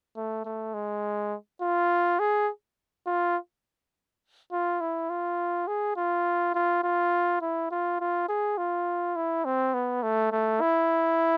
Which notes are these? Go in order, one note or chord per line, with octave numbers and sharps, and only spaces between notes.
A3
A3
G#3
F4
G#4
F4
F4
E4
F4
G#4
F4
F4
F4
E4
F4
F4
G#4
F4
E4
C4
B3
A3
A3
E4